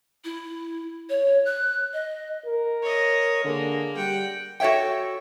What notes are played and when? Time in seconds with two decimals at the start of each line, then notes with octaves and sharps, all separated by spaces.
0.24 E4
1.10 C#5
1.46 F#6
1.93 D#5
2.46 A#4
2.82 C#5 D#5
3.44 D3 G#3 A#3
3.97 G3 F#5 G5
4.60 F#4 A4 C#5 E5 G5